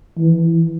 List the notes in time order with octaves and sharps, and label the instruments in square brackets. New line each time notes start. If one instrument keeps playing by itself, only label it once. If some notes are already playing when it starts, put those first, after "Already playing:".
[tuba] E3